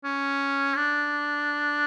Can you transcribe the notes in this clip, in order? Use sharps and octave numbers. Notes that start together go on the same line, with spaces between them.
C#4
D4